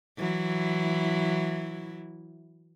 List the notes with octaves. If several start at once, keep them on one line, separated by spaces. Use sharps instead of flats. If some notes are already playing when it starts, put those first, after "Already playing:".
E3 F#3 E4